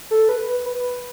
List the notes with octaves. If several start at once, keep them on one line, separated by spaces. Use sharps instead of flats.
A4
B4
B4